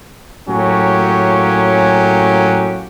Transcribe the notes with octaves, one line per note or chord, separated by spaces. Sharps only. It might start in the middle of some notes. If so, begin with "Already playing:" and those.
A2 F#3 A#3 C#4 G4